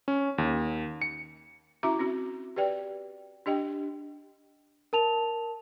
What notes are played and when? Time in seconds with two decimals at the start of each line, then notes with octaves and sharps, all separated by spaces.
0.08 C#4
0.38 D#2
1.02 C#7
1.83 C#4 E4 F#4 E5 A#5 D6
1.99 C4 C#4 F#4
2.56 G4 B4 D5 G5
3.46 D4 G4 D#5 G5
4.93 A#4 A5 F7